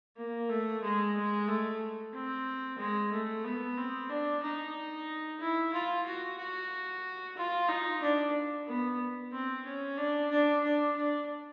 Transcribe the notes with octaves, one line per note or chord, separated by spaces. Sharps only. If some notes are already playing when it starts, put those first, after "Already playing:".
A#3
A3
G#3
G#3
A3
C4
G#3
A3
B3
C4
D4
D#4
E4
F4
F#4
F#4
F4
D#4
D4
B3
C4
C#4
D4
D4
D4
D4